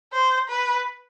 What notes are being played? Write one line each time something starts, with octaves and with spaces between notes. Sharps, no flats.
C5
B4